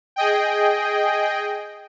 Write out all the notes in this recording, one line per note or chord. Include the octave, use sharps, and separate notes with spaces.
G#4 D#5 G5